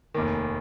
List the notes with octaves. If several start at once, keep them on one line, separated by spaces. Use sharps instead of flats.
F1 D#2 D#3